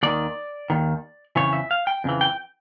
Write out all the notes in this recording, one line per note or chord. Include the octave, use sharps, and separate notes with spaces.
D#2 D#3 D5
D#2 D#3
F2 C#3 E3 C#5
E5
F5
G5
F2 C#3 E3
G5